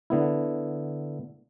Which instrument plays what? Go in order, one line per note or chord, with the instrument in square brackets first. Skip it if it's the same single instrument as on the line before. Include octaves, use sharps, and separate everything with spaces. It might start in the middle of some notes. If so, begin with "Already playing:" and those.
[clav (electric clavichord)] D3 B3 E4